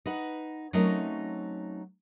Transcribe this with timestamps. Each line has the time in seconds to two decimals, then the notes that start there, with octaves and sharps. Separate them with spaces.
0.06 D#4 B4 F#5
0.73 F#3 A3 C4 C#4 D#4 A#4